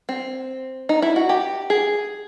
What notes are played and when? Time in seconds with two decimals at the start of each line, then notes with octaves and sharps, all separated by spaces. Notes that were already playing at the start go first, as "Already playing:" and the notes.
0.09 C4
0.89 D#4
1.02 E4
1.16 F#4
1.29 G4
1.70 G#4